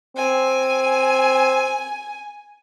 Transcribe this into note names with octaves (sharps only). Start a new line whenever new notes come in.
C4 G#5